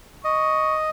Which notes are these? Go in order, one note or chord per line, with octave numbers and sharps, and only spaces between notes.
D#5 C#6